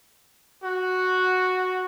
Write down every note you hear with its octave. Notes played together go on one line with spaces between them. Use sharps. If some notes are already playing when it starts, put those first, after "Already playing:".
F#4